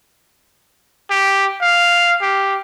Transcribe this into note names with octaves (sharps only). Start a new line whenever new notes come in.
G4
F5
G4